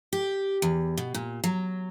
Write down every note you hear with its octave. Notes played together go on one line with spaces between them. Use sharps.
G4
E2
B2
A#2
F#3